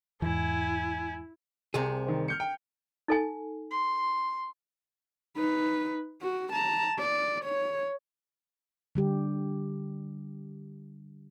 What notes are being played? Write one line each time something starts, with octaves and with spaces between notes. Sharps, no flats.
E2 G#2 E3 E4 G#5
C2 C3 G#4
D#3 C4
F6 G6 C#7
G5
D#4 A4 G#5
C6
D#4 B4
F#4
A5 A#5
D5
C#5
D3 G3 G4